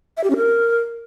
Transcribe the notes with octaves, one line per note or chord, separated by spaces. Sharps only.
E5
G4
C#4
A#4